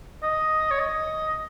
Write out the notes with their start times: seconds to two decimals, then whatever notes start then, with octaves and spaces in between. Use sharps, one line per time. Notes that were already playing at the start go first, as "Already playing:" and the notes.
0.23 D#5
0.71 C#5
0.79 D#5